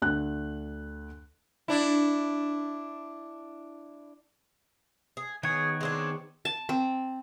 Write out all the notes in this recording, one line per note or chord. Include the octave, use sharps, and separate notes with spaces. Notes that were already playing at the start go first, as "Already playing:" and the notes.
D2 F#6
D4 E4
G#4
D#3 B3 G#4 C#5
G#3 C4 D4
A5
C4